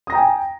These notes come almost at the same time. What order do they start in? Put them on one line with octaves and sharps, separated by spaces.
D#6 A#6 A#5 G5 G#5